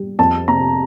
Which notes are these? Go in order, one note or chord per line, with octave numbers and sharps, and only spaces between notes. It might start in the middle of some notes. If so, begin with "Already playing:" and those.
Already playing: G3
F2 A5
C3 A#5